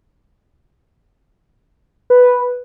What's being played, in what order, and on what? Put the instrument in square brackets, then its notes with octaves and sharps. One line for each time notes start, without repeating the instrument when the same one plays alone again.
[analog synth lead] B4